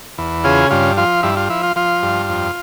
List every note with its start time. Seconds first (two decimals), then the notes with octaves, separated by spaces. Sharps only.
0.18 E2
0.44 C#3 F4 G#4
0.71 G2 F4
0.97 F3 F4
1.23 G2 E4
1.37 F4
1.49 F3 E4
1.63 F4
1.76 F3 F4
2.03 G2
2.29 F2